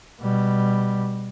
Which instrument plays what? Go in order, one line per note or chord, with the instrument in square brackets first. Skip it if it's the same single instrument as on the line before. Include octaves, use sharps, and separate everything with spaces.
[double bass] B2 G3